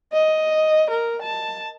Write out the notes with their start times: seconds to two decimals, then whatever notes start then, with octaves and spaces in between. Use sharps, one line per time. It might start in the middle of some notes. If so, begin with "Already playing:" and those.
0.13 D#5
0.90 A#4
1.22 A5